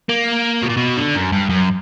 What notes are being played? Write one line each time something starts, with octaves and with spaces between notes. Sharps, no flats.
A#3
B2
A#2
B2
D3
F#2
G2
F#2